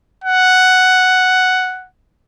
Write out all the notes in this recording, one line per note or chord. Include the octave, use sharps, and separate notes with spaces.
F#5